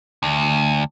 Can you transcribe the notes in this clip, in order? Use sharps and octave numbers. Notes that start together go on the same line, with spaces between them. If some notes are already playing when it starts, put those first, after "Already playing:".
D2